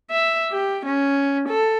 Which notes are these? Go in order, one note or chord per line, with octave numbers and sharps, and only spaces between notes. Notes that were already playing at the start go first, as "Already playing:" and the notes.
E5
G4
C#4
A4